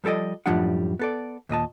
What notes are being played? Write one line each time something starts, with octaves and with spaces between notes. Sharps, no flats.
F3 G3 A4 D5 D#5
F#2 A2 F3 G3 D4 F#5
B3 A4 D5
D#2 A#2 D#5 A5